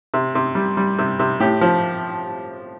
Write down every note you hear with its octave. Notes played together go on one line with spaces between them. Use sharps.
C3
C3
G3
G3
C3
C3
A2 G4
F3